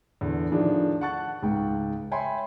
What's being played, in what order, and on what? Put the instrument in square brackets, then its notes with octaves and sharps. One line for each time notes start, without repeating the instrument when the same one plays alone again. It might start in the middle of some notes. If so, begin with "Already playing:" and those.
[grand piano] E2 D3
A2 D#3 F3 D4 G#4
F#5 A5 C#6 F#6 A6
C#2 G#2 G5
C#5 E5 G5 G#5 B5 C6